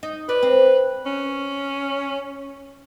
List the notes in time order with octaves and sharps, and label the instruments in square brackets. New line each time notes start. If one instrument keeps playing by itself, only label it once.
[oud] D#4
[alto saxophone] B4 [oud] D5
[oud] C4
[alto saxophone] C#4